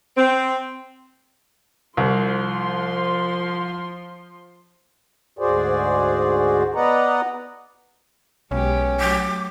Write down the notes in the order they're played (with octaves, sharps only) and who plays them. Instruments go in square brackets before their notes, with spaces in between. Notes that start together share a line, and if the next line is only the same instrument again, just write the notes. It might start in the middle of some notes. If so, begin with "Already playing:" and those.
[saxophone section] C4
[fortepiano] C2 [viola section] F3 C6
[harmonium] D2 G#2 F#4 G#4 C5 D5
B3 B4 D5 D#5 F#5 A#5
[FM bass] B1 [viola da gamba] G#3 B3 G4 [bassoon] C#4
[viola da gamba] F#3 A3 [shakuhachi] D6